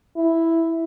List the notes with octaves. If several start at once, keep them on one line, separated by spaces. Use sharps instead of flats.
E4